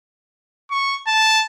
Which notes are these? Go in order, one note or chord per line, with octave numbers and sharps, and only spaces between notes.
C#6
A5